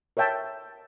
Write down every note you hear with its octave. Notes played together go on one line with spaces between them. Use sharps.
A#4 C#5 E5 G5 A5